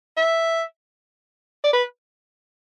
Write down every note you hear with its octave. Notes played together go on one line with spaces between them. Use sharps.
E5
D5
B4